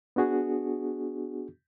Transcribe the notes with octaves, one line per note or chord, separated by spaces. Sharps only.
B3 D4 F#4 G#4